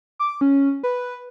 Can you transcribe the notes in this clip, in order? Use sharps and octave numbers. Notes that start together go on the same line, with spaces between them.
D6
C#4
B4